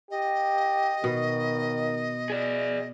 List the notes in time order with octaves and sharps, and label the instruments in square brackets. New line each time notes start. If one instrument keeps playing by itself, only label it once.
[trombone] G4 [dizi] D#5
[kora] B2 [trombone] D#3
[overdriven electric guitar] G#4 D5